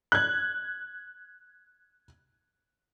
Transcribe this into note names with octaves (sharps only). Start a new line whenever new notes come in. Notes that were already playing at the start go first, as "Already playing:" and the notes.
F#6 G#6